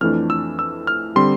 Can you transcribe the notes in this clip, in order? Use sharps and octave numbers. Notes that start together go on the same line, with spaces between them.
F2 E3 A3 D4 F6
E6
E6
F6
D3 G3 C4 C6